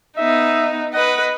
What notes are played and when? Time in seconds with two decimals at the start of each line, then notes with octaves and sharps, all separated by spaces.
0.17 B3 D#4 E5
0.93 B4 D#5 F#5